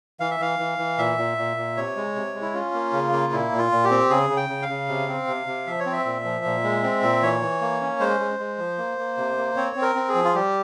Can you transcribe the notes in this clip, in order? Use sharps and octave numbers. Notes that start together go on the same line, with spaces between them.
E3 F5
E5
E3 F5
E3
E3
A#2 E5
A#2
A#2
A#2
C3 C#5
G#3
C3
G#3
E4
C#4 F4
A#3
C#3
A#3
A#2 E4
A#2
F4
A#2
G4
C4
C#3 G#4
C#3
G5
C#3
F5
C#3
C3
C4
C3
C3
F3 E5
C#5
C4
E5
A#2
F3
A#2
G#3
C4
A#2
E3 C#5
E3
A#3
C#4
G#3 C5
G#3
G#3
F3
A#3
A#3
C3
A#3
C4 C#5
C4
A#4
C4
G#4
F3
F4
G3 G4